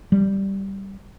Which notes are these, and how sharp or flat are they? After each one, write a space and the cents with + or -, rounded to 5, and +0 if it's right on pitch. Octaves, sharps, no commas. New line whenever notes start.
G3 -5